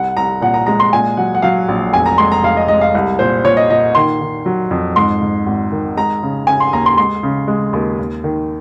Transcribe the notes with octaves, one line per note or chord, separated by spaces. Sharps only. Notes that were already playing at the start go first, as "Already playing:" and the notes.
Already playing: C2 F#5
C2 A#5
A#2 F#5
A#5
G#3 A#5
C6
A#2 G#5
F#3 F#5
F#5
F#3 F5
A#1
F1 G#5
A#5
G#3 C6
A#5
F1 F5
D#5
G#3 D#5
F5
C2
A#2 C5
A#2 C#5
D#5
A#2 D#5
D#3 C6
D#3
F#3
F2
G#2 C6
G#2
G#1
D#3
G#3 A#5
C#3
C#3 G#5
C6
D#2 A#5
C6
G#3 C6
C#3
G#3
D#2
D#2
D#3